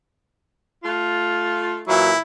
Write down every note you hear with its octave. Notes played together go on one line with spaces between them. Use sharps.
A3 F4
A#2 E3 F#3 E4